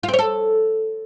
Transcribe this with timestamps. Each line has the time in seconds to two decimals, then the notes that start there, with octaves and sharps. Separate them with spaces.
0.03 F4
0.08 C4
0.14 C#5
0.19 A4